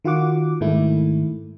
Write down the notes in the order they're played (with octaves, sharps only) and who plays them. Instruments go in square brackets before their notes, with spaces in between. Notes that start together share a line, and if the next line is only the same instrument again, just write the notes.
[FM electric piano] D#3 F4 F#4 F#5 D6
G#2 D#3 A3 E4